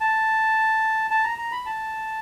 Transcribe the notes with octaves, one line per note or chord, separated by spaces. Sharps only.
A5
A5
A#5
A#5
B5
A5